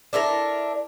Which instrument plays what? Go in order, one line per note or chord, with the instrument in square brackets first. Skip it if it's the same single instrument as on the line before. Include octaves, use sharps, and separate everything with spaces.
[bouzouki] D4 E4 A4 A#4